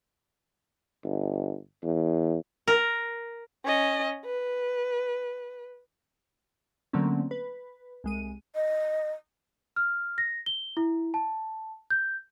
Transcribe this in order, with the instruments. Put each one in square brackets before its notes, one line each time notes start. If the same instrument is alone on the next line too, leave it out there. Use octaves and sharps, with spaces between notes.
[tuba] G1
E2
[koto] A#4
[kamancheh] C#4 D#5
B4
[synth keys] D3 F#3 A3 A#3 C4 C#4
B4
C2 G#3 D#7
[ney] D#5
[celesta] F6
A#6
G7
E4
A5
G6